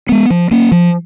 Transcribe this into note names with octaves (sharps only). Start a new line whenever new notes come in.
G#3 B3
F3
A#3 C#4
F3